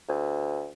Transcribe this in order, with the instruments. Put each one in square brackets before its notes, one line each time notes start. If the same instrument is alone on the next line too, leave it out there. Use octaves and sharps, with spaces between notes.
[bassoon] D2